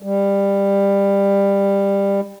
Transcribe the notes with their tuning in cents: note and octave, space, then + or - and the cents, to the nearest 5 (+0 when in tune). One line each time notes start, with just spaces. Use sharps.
G3 +20